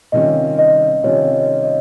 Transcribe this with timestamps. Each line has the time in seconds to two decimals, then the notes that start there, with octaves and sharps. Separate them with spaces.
0.12 C3 D#3 G3 C#4 F4 D#5
0.59 D#5
1.03 C3 D#3 G3 C#4 F4 C#5
1.33 D#5
1.64 D#5